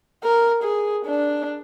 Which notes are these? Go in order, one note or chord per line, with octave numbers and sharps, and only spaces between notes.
A#4
G#4
D4